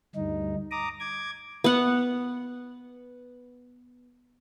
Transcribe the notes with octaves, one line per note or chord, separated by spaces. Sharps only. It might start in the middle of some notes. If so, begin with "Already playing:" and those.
D2 G2 D#4
A#5 D6 D#6
D6 G#6
B3 F#5